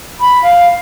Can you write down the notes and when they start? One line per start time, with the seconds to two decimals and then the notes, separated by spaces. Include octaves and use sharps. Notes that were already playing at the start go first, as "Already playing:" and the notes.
0.20 B5
0.43 F5